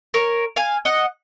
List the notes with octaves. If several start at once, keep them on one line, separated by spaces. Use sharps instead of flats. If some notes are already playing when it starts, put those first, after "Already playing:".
A#4 C#5
F5 G#5
D#5 F#5